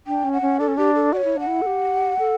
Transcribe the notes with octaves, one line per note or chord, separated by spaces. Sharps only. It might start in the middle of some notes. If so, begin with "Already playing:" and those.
D4 G5
C#4
F#5
C#4
D4 A4
C#4
D4 G4
A4
F#4 C#5 D5
E4
D4 F#5
E4
A4
G4
A4